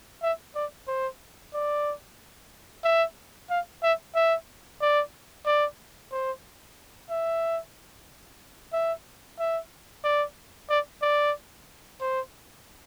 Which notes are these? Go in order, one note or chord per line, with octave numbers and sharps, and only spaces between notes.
E5
D5
C5
D5
E5
F5
E5
E5
D5
D5
C5
E5
E5
E5
D5
D5
D5
C5